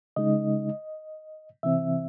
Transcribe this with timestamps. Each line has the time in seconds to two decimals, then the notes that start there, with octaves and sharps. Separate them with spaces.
0.16 C#3 G#3 D#4 D#5
1.63 C3 E3 C4 E5